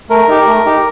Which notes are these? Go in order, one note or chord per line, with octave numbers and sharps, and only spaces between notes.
A3 A#4
D#4 G4
A3
D#4 G4